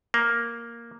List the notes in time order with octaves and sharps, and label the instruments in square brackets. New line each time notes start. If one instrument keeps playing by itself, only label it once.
[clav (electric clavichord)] A#3